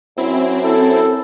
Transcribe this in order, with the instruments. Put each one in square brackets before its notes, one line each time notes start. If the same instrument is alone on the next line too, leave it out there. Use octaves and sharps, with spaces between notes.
[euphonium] F#2 [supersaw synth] C4 E4
[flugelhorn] A4